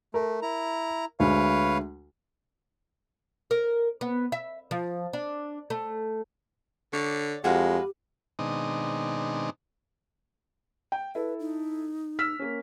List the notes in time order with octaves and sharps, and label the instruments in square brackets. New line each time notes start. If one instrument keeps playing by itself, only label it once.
[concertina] A3 [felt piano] A#4
[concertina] E4 A#5
[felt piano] D2 G#3 [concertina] B4 C#5 F5
[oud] A#4
B3
E5
F3
D4
A3
[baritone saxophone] D3 [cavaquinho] C#5 D5
[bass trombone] F2 [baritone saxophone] G#3 [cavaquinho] F#4 B4 F5 [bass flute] G4
[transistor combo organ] B2 D#3 G#3 C4 D4 D#4
[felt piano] G5
[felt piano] E4 A4 [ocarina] B4
[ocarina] D#4
[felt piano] E6 F6 B6
A#3 C#4